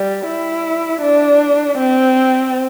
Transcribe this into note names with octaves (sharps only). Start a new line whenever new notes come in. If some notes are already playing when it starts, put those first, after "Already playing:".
Already playing: G3
E4
D4
C4